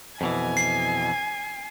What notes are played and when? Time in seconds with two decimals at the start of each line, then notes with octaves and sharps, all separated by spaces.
0.21 F2 B2 E3 G#5
0.57 C7